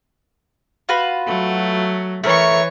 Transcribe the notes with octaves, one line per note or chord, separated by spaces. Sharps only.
F4 F#4 B4
F#3 A3
E3 A3 A#4 C#5 C#6